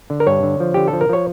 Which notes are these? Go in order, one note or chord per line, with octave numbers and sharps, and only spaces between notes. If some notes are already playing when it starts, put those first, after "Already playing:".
D3
A#4
G2 C#5
D3
F3
D3 G4
A4
F3
A#4
F3 C#5